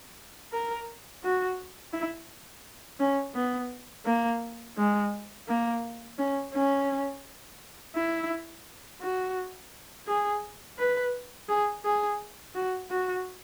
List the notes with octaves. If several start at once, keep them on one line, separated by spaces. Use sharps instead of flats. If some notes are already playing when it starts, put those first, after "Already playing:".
A#4
F#4
E4
C#4
B3
A#3
G#3
A#3
C#4
C#4
E4
F#4
G#4
B4
G#4
G#4
F#4
F#4